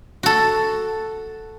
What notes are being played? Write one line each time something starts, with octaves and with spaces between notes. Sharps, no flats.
F#4 A4